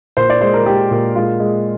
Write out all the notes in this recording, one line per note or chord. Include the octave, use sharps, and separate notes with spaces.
A#2 C5
D5
G#3 C5
A#4
G#3 G4
A#2
G#3 F4
G#3